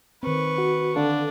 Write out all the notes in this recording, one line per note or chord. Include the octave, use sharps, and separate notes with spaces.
D#3 C4 B4 C#6
F#4
D3 D4 A4 F5